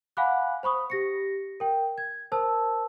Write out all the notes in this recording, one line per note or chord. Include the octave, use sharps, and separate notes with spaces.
F5 F#5 G#5 B5 D6 F#6
C5 B5 C#6 D#6
G4 A#6 C#7
A#4 G5
G#6
A#4 C5 A5 E6